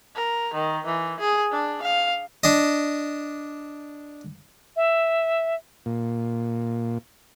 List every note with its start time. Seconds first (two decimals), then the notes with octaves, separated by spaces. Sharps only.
0.16 A#4
0.54 D#3
0.86 E3
1.20 G#4
1.52 D4
1.83 F5
2.44 D4 D#5
4.76 E5
5.86 A#2